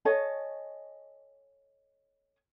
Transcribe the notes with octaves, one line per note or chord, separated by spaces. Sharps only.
A4 C#5 D#5 G#5